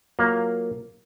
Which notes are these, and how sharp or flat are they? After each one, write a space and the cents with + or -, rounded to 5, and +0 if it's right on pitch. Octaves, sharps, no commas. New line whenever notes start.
F#3 +0 A#3 +0 F4 +0